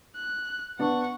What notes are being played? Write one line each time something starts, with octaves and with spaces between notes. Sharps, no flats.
F#6
B3 D4 F#5 C#6